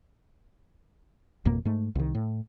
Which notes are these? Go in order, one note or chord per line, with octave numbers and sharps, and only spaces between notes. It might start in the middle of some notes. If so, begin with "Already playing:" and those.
G#1 F2 B2 A#3
G#2 A3
C2 D#3
A2